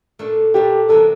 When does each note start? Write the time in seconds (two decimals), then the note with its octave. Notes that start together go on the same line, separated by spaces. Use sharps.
0.19 A#2 A3 D4
0.54 A#2 A3 D4 G4
0.89 E2 C3 E3 A#3 D4 A4